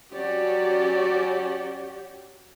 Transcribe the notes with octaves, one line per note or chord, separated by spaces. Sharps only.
F#3 C#4 F#4 G4 C#5 D5